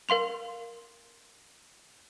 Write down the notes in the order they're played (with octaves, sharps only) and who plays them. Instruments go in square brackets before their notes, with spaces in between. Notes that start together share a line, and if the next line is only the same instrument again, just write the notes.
[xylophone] A#4 F5 C6 F7